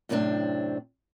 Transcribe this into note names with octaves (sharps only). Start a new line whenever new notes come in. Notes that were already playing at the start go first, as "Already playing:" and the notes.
F#2 A2 C3 C4 D4